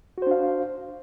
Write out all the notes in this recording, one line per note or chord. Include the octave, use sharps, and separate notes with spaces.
D4 F#4 C5 F5